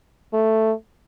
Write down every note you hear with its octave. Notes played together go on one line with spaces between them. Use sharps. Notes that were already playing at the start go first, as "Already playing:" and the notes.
A3